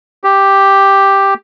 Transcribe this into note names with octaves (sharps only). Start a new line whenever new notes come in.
G4